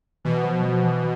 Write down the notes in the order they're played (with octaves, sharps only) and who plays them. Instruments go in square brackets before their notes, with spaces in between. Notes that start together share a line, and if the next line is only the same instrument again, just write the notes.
[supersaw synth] B2 [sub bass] E3
[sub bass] F3
F3
E3